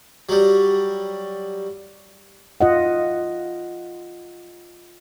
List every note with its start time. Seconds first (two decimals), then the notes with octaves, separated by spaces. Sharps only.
0.29 F#3 G3
2.61 F4 D#5 F#5